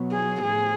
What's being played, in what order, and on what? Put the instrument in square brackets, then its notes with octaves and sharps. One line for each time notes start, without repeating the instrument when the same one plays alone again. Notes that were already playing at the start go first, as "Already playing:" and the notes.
Already playing: [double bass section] B2 F#3 B3
[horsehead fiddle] G#4
[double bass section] A2 F3 [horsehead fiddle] G#4